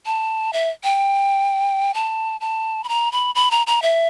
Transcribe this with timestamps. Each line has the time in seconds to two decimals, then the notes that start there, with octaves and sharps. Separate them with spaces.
0.06 A5
0.53 E5
0.84 G5
1.94 A5
2.41 A5
2.84 B5
2.89 A#5
3.12 B5
3.35 B5
3.51 A#5
3.67 A#5
3.82 E5